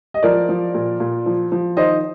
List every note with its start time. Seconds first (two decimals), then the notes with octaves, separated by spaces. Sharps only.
0.14 D#5
0.23 F3 A#4 D5
0.49 F3
0.74 A#2
1.00 A#2
1.26 F3
1.52 F3
1.77 D#3 C5 D#5